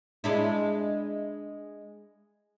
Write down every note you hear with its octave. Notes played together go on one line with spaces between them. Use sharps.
G#3 D4 E4